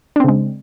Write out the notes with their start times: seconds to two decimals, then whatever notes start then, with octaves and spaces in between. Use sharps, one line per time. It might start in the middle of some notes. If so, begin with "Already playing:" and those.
0.16 D4
0.20 C4
0.24 C#3
0.28 G#3